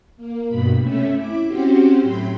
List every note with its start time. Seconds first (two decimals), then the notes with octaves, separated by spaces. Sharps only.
0.17 A#3
0.47 G2 B2 B5
0.80 C3 A3 C#4 E5
1.16 E4 D6
1.47 C4 C#4 F#4 G4 C5
2.02 A2 F#3 G5 B5 C6